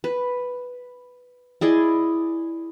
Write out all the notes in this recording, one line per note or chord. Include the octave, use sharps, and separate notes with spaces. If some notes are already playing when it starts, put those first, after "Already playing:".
B4
E4 G#4 D5 D#5